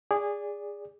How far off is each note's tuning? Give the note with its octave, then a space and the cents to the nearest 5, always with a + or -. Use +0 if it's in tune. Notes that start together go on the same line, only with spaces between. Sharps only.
G#4 -20 D5 -10